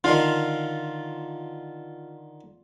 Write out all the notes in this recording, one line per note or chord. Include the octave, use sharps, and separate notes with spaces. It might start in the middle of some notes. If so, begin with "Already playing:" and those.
D3 D#3 F4